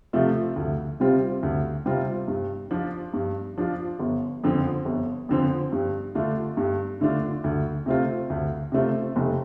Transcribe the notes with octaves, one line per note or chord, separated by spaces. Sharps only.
C3 F3 A3 F4
D2
C3 G3 C4 F4
D2
C3 G3 C4 F4
G2
F3 D4 F4
G2
F3 D4 F4
G1
F2 D3 F3 C4
G1
F2 D3 F3 C4
G2
D3 A3 D4 F4
G2
D3 A3 D4 F4
D2
C3 A3 C4 F4
D2
C3 A3 C4 F4
F1